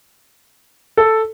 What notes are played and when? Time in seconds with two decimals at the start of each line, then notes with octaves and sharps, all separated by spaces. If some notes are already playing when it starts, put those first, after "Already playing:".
0.97 A4